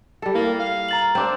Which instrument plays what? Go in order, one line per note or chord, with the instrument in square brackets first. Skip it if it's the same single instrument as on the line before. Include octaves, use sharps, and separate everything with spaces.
[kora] G3 A4
[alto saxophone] A#3 [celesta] E4
[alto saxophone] F5
[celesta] A#5 A6 F#7
[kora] C4 D4